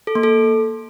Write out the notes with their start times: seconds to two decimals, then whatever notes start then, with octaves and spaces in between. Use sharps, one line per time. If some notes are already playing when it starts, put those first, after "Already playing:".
0.07 A4
0.15 A#3
0.23 A4